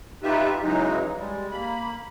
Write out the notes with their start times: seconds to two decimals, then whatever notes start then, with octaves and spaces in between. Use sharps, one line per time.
0.23 D#4 F4 G4 B4 E5
0.62 C#3 E3 F#3 G#3 D#4
1.16 G3 G#3
1.52 A#3 B5